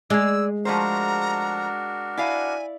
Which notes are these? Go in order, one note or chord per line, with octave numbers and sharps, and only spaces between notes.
G#3 G#4 D5 E6
F3 A3 D4 F#4 A#4 C5 A#5
E4 D5 F5 G#5